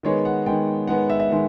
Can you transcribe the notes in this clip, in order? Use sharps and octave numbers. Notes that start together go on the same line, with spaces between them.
D#3 G#3 B3 C#5
F#5
D#3 G#3 B3 G5
D#3 G#3 B3 F#5
E5
E5
D#3 G#3